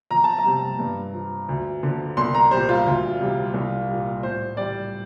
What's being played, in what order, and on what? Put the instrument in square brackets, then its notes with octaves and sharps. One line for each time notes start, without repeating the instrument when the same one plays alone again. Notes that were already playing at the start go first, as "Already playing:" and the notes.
[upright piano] F2 A#5
A5
A#5
C3 G3
G2
F3
D2
D3 F3
C2 C6
A#5
A#2 G3 C5
F4
D2
C3 G3
C2
A#2 G3
A2 C5
G3 D5